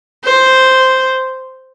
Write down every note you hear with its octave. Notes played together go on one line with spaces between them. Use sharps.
C5